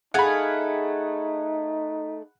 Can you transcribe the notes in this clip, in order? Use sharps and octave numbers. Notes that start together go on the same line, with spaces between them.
A3 D#4 G#4 F5 F#5 B5